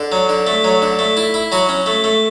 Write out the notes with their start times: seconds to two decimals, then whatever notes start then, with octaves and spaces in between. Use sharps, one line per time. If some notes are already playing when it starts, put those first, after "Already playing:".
Already playing: D3
0.12 F#3
0.29 D3
0.47 A3
0.64 F#3
0.82 D3
0.99 A3
1.17 E4
1.34 E4
1.52 F#3 F#4
1.69 C#4
1.86 A3
2.04 A3